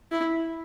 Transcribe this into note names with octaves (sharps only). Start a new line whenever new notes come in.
E4